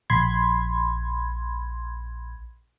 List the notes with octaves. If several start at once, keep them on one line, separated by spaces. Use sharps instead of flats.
A#1 B5 C6 G#6